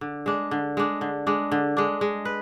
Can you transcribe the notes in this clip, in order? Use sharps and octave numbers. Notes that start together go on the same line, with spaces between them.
D3
G#3 D4
D3
G#3 D4
D3
G#3 D4
D3
G#3 D4
G#3
B4